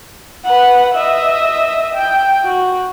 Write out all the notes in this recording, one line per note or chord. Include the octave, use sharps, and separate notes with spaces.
B4 F#5
D#5 E5
G5
F#4